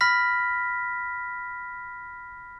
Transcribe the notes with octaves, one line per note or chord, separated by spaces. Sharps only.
B5 F6 A#6 B6